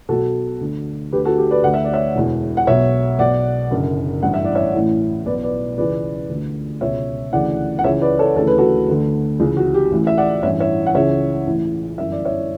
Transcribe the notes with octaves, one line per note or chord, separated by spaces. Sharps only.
B1 B2 F#4 A4
D2 D3
D2 D3 G4 B4
F#4 A4
G4
B4 D5
D2 D3 F#5
E5
D5
C#5 E5
E1 E2 B2
F#5
B1 B2 C#5 E5
B1 B2 D5 F#5
F#1 F#2 D3
A1 G2 E3 F#5
E5
D5
C#5 E5
A1 A2 E3
B1 B2 B4 D5
B4 D5
C#2 C#3 E3 B4 D5
D2 D3
C#2 B2 C#5 E5
D2 C#3 E3 D5 F#5
F#5
C#2 C#3 E3 C#5 E5
B4 D5
A4 C#5
D2 C#3 E3 A4
B4
F#4 A4
D2 D3
C#2 C#3 E3
F#4
G4
A1 A2 E3
E5
D5 F#5
A1 G2 E3 C#5 E5
C#5 E5
F#5
C#2 C#3 E3 C#5 E5
A1 A2 E3
G1 F#2 E3 E5
D5
C#5 E5